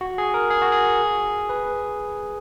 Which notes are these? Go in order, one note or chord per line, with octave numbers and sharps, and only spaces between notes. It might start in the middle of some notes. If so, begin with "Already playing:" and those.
F#4
G#4
A#4
G#4
F#4
G#4
B4